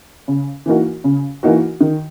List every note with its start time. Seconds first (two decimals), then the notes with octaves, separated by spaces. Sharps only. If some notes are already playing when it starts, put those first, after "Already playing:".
0.28 C#3
0.66 E3 A#3 D#4 F#4
1.04 C#3
1.43 E3 A#3 D#4 F#4
1.81 D#3